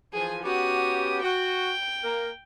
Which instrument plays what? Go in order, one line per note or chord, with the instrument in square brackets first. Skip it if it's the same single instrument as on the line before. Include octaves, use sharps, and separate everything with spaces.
[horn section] E3 F3 [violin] G#4 G#5
[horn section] B3 C#4 G4 [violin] F#4 D#6
[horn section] F#4 [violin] G5
[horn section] A#3 A#4